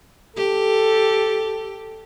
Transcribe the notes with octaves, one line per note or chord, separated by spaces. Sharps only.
G4 A4